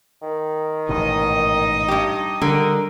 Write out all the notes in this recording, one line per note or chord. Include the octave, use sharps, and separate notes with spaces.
D#3
A1 G#2 B2 D#4 D#5
G2 G4
D3 G3 A#4